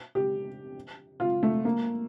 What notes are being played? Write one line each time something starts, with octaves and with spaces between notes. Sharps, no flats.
G4
F4
A3
A#3